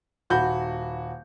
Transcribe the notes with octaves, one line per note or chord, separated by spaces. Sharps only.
D#1 F#4 B5 G6